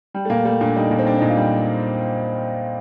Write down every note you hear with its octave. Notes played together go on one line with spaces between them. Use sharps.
G3
A3
A#2 A#3
G3 A3
A#2 D4
G3 D#4
A#2
C4
G3 D4
D#4
A#2
F4
G3